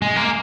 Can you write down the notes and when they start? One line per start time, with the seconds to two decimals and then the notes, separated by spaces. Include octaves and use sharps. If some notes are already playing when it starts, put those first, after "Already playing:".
0.02 G#3
0.16 A#3